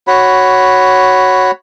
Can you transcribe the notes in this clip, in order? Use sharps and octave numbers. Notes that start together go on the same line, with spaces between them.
F#4 C#5 B5